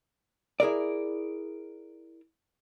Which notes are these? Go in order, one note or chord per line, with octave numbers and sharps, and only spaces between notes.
E4 G#4 A#4 D5